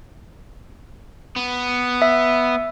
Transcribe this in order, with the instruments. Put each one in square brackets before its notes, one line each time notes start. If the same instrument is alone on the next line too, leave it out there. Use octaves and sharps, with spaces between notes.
[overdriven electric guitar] B3
[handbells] E5